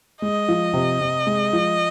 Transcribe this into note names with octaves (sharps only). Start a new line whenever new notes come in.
G#3 D#5
F3
C3
C3
G#3
F3